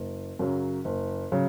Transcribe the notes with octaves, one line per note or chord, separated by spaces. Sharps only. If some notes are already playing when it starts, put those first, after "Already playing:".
Already playing: F#1
F#2 C#3 F#3
F#1
C#3 F#3